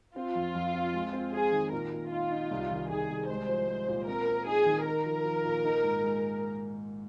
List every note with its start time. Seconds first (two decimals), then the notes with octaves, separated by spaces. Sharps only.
0.16 C4 F4
0.35 F2
0.55 F2
0.74 C4
0.94 G#3
1.13 C4
1.33 C4 G#4
1.52 D#3
1.72 A#2 A#4
1.92 A#2
2.11 D#4 F4
2.31 D#4
2.51 C2
2.71 D#3
2.90 D#3 G#4
3.09 C2
3.30 G#3 C5
3.49 F3
3.69 G#3
3.88 A#2
4.08 C4 A#4
4.27 C4
4.46 D#4 G#4
4.66 D#3
4.86 D#4 A#4
5.05 F3
5.25 F3
5.45 A#2
5.65 D#4
5.84 G#2
6.04 G#3